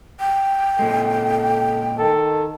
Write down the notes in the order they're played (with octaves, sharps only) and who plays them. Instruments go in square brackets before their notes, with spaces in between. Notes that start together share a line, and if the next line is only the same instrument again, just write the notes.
[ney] G5
[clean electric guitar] A#2 G#3 [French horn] A4
[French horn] D#3 [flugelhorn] A4